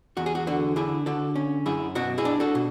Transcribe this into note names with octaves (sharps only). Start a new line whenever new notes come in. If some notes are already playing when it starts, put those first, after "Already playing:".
E2 F#4
G#4
F#4
D3 F#4
D3 E4 G#4
D3 F#4 A4
C#4
F#2 E4 G#4
B2 F#4
E4 G#4
D4
F#4 A4
B2